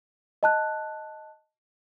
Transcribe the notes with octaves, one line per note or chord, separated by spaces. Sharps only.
D#5 A5 F#6